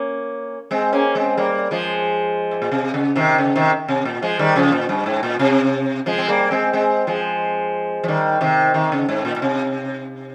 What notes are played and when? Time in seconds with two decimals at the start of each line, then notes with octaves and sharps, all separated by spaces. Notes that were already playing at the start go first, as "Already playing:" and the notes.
Already playing: A#3 C#4
0.71 G#3 C4
0.92 A#3 C#4
1.15 G#3 C4
1.37 G3 A#3
1.71 F3 G#3
2.51 G#2
2.62 A#2
2.71 C3
2.94 C#3
3.16 C3 D#3
3.38 C#3
3.56 C3 D#3
3.88 C3
4.05 A#2
4.22 F3 G#3
4.39 D#3 G3
4.56 C#3 F3
4.72 A#2
4.89 G2
5.06 G#2
5.23 A#2
5.39 C3
6.06 F3 G#3
6.18 C4
6.28 G3 A#3
6.51 G#3 C4
6.73 G#3 C4
7.07 F3 G#3
8.03 F3
8.08 D#3 G3
8.41 C3 D#3
8.74 C3 D#3
8.92 C#3
9.09 G#2
9.25 A#2
9.36 A#2
9.42 C3